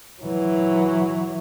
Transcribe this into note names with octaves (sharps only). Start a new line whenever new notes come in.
E3 F#3